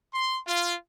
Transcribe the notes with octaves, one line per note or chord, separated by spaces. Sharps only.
C6
F4